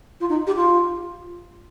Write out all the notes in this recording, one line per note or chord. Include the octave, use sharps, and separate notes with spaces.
F4
D#4
G4
F4